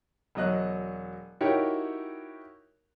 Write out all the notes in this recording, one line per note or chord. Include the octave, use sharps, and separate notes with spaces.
E1 F#3 D#5 F#6
D#4 E4 F#4 G4 A#4 C#5